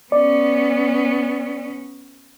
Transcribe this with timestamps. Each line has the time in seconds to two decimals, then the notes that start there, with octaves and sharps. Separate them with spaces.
0.12 B3 C#4 D5